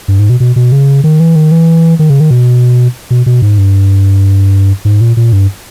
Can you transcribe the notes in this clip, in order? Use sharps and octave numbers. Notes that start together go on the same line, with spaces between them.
G2
G#2
B2
B2
B2
C#3
D#3
E3
D#3
E3
D#3
C#3
D#3
B2
B2
B2
G#2
G2
G#2
A#2
A#2
G2